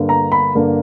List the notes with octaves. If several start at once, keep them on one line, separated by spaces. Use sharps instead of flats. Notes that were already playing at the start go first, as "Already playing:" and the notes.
Already playing: G2 D3 A#3 D4
A#5
B5
G2 D3 A#3 D4